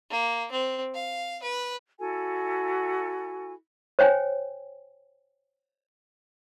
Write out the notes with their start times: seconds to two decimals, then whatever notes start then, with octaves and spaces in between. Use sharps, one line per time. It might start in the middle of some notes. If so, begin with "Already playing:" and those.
0.10 A#3
0.51 C4
0.95 F5
1.43 B4
2.00 E4 F#4 A4 G#5
3.99 C5 C#5 G5 G#5